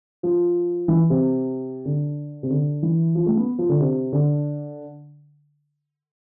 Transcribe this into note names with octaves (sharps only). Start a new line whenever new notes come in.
F3
E3
C3
D3
C3
D3
E3
F3
A3
B3
F3
D3
C3
D3